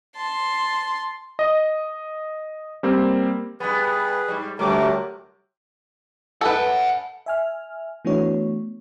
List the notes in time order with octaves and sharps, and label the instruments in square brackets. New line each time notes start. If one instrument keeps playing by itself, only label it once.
[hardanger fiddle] A5 C6
[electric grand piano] D#5
G3 A#3 C4
[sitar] G2 B3 [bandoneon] G#4 B4
[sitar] G#2 G3
[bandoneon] D2 A3 A#4 [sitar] C3 F#3 [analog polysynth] G3 D6
[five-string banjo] A4 B4 [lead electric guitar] F#5 G#5
[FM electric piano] E5 G#5 F6
E3 A3 B3 D4 F#4 C#5